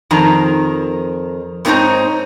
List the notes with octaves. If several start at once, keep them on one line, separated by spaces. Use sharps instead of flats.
F2 D#3 A#5
G#2 B3 C4 D#4 C#5 A#5